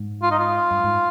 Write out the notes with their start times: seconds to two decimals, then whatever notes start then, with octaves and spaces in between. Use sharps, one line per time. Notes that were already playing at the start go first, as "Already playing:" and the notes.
Already playing: G#2
0.22 F4
0.31 D#4
0.39 F4
0.71 G2
0.84 G#2